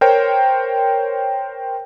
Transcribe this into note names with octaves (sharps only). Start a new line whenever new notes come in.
A#4 C5 C#5 G5